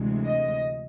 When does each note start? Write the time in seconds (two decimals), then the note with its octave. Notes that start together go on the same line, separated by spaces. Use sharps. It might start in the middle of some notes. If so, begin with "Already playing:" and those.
Already playing: D2 C3 E3 G#3
0.27 D#5